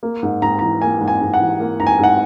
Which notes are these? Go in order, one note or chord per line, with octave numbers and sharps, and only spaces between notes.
A#3
G#2
G#2 A#5
E3 A#5
A#3 G#5
G#2
G#5
G#2
F#5
E3
A#3
G#2 A#5
G#5
G#2 F#5